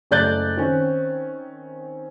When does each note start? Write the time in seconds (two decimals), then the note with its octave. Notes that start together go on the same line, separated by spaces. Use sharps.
0.11 F#1 A3 D5 F#6 G6 A6
0.57 D#3 C4 C#4